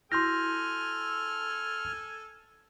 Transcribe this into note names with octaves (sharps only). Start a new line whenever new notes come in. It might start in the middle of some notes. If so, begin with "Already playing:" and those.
E4 F#4 A4 G#5 C6 F6 G6 A#6